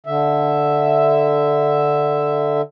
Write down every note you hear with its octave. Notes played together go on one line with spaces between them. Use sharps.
D3 E5